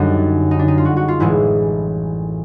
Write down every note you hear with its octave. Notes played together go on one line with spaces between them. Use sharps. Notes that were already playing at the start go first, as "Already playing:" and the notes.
Already playing: F#2 D3 G3 D#4
D#4
D4
D#4
F4
F#4
F#4
F4
A1 A2 E3 G#3 E4